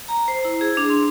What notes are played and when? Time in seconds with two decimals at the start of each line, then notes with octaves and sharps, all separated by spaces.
0.08 A#5
0.28 C5
0.45 E4
0.61 G#4
0.77 D4
0.90 C6